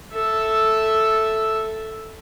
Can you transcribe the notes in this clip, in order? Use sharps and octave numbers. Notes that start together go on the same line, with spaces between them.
A4 E5